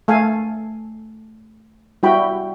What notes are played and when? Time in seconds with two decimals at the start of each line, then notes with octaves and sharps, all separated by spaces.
0.08 A3 A4 F5 G#5
2.03 G3 E4 F#4 G5 B5